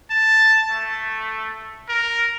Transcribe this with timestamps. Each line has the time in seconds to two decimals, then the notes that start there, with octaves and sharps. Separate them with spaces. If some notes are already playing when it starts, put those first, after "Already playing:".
0.10 A5
0.71 A3
1.89 A#4